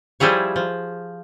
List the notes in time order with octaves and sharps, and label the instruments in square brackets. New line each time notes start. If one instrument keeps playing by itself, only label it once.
[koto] F3 G3 E4 G#4 C#5
F3